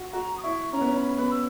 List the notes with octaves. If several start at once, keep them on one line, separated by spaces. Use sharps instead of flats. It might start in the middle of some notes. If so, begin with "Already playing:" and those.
Already playing: F#4
F#4 A#5
D#6
E4 C#6
C#4 A#5
B3
C#4
B5
B3 B5
E6